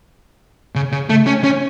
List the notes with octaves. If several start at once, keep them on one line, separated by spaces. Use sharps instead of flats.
C#3
C#3
A3
C#4
C#4